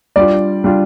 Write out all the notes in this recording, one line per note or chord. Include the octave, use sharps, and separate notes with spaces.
G3 D4 F4 D5
G3 D4 F4